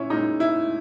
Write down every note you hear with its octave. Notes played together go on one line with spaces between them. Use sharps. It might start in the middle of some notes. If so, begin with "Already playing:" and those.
Already playing: A#2 C#4 E4
A#2 G#3 D#4
E4